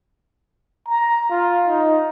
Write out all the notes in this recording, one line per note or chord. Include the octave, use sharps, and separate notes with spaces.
A#5
F4
D#4